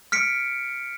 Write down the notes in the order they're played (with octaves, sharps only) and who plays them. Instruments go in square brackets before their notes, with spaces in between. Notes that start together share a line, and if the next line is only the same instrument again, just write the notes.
[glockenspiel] F6 B6 C#7 D7